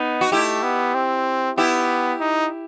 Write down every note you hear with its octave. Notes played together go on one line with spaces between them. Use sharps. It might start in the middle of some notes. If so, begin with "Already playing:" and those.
Already playing: B3 D#4
F#4
A3 E4 G4
B3
C4
B3 E4 G4
D#4